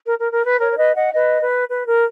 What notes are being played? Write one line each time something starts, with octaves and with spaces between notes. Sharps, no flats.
A#4
A#4
A#4
B4
A#4 C#5
C#5
B4 D#5
D#5 F#5
B4 D#5
B4
B4
A#4